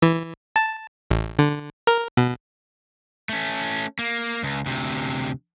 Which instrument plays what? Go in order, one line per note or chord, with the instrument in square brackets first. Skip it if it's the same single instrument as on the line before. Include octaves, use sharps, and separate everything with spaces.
[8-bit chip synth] E3
A5
A1
D3
A#4
B2
[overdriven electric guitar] A3 C#4
A#3
C#2
D2 C3